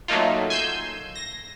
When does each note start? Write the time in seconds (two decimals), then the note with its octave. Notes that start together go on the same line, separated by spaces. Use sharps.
0.08 F#3 A3 A#3 D#4 F4
0.50 G#5 C6 E6 G6
1.16 A#6